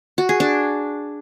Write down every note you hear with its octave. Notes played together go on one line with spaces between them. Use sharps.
F#4
G#4
D4